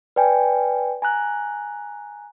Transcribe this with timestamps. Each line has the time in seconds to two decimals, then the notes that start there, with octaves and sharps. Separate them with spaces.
0.16 B4 D5 G5 G#5
1.02 G#5 A#5 F#6